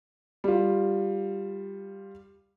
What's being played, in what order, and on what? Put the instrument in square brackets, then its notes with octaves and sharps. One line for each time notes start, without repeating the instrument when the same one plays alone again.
[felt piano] G3 F4